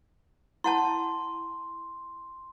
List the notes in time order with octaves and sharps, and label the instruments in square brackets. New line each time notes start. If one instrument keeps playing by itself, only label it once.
[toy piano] E4 F#5 A5 [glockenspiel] C6